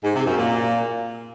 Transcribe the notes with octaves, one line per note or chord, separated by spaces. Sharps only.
G#2
C3
F#2
A#2